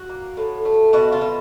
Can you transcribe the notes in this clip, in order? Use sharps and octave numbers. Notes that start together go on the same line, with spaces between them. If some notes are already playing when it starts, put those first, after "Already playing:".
Already playing: F#4
A#3
A2
A3
B2 F#4
F4
B2